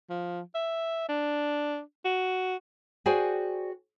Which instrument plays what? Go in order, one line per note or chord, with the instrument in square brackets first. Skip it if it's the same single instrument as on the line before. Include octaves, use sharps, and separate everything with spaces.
[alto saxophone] F3
E5
D4
F#4
[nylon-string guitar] F#4 G#4 C5 D5 G5 G#5